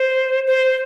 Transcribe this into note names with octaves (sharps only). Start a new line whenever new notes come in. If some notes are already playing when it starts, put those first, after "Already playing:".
Already playing: C5
C5